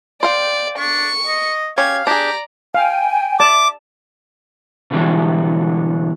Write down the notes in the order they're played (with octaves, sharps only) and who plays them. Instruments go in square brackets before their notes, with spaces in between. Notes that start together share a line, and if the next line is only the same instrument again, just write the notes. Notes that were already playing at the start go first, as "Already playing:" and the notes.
[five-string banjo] C5 F5 G5 [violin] D5
[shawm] D4 [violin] C#6 C#7
[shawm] D#5
[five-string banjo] C#4 G4 C#5 [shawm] F5 [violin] G#6
[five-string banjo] D4 G#4 [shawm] G4 [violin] D5 A#5
[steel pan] F5 [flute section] G5 G#5
[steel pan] D5 A5 [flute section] E5 [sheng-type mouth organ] D6
[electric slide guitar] B2 D3 E3 G3